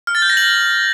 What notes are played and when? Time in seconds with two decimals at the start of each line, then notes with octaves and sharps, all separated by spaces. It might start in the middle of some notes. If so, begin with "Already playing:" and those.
0.07 F6
0.15 A6
0.22 G6
0.30 A#6
0.37 F#7